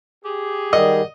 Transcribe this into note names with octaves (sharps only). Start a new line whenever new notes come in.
G4 G#4
D#3 G3 A#4 D5 D#5 F#5